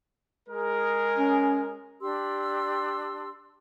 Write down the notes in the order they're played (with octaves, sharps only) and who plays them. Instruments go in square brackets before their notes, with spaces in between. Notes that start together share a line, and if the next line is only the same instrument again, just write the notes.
[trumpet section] G#3 G#4 A#4
[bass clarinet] C#4
[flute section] D4 G4 C6 E6